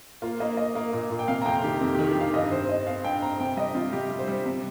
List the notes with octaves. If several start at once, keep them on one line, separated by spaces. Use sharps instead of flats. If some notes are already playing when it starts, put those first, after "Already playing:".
A#3 F4
A#3 D#5
A#3 D#5
A#3
A#2
A#2
G5
C3 F5
A#5
F2 G5
D#3 G4
F2
G4
D#3
G4
D#3 F5
G2 D#5
C4 C5
C4 D#5
C4 F5
G2 G5
C4 A#5
C3 G5
G3 D#5
C3 F4
G3 G4
G3
C5
G3
C3